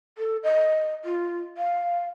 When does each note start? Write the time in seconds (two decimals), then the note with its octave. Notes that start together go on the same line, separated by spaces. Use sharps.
0.18 A4
0.43 D#5
1.05 F4
1.57 F5